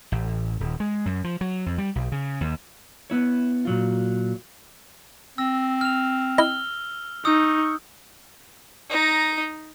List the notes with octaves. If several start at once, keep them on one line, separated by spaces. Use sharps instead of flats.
A1
D#1
G#3
F#2
F3
F#3
F2
G3
B1
C#3
D#2
B3 E4 C#5
A#2 F#3 F4
C4 E6 A#6
F6 F7
E4 D#5 F6 G7
D#4 C#6 D#6 E6 G6
D#4 A#5